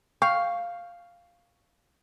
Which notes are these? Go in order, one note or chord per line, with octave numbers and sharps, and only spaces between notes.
F5 G5 C#6 G6